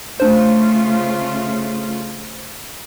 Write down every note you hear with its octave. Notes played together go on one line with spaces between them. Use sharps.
C#3 A3 D4 F4 C5